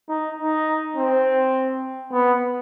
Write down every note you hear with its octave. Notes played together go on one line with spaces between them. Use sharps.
D#4
D#4
C4
B3